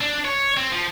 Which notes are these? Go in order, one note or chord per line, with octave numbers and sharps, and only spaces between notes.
D4
C#5
C4
F3